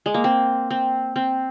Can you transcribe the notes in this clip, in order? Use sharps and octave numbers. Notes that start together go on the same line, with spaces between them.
G#3
A#3
C4
C4
C4